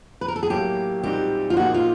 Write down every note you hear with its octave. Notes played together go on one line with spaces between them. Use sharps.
B4
A#4
A4
G#4
A2 F#3 A#3 G4
A#2 G3 C4 D#4 F#4 G4
F4
A#2 F3 A#3 D#4 F#4 G#4
F4